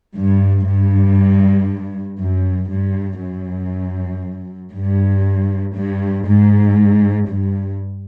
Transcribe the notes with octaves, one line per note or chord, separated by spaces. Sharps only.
G2
G2
F#2
G2
F#2
G2
G2
G#2
G2